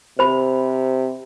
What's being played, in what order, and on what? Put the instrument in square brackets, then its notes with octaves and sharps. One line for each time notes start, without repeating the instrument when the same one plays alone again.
[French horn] C3 [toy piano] C5 B5